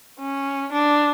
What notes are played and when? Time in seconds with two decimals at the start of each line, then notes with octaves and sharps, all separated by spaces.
0.19 C#4
0.72 D4